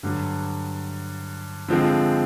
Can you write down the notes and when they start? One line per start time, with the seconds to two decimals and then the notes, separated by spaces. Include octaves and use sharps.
0.03 G2 D3 F#3
1.68 D3 F3 G#3 C4 F4